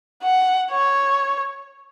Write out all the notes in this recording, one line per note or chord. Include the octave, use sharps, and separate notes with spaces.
F#5
C#5